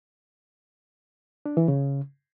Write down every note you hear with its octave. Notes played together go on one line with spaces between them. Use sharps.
D4
E3
C#3